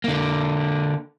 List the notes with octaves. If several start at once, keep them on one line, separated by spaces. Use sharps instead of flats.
D3 A#3